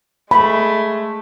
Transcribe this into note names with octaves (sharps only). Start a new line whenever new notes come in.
G#3 A3 B5